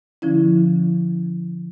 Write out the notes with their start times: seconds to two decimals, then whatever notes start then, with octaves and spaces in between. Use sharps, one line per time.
0.22 D3 F3 C#4 E4